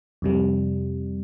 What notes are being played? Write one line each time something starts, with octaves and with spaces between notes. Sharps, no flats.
F2 C3 G3